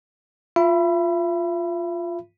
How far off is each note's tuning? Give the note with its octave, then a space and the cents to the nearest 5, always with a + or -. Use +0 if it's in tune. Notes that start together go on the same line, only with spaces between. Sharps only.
F4 +0 E5 +35 B5 +0